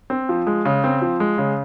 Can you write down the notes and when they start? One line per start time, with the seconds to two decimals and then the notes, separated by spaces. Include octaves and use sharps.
0.10 C4
0.29 F3
0.47 G#3
0.65 C#3
0.84 C4
1.02 F3
1.20 G#3
1.38 C#3